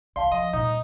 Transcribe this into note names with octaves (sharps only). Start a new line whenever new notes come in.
C2 D5 F5 A5 C6
F3 D#5
G2 A#2 D#4 D#6